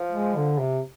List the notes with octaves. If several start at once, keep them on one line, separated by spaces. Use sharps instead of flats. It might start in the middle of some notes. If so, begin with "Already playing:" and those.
Already playing: F3
G#3
D3
C3